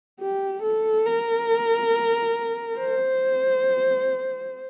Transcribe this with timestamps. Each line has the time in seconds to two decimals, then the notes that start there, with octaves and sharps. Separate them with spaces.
0.20 G4
0.62 A4
1.06 A#4
2.79 C5